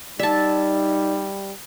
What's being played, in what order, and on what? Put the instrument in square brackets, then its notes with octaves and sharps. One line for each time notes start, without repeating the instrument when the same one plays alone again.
[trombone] G3 [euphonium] D#4 [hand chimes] D5 [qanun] E5 A5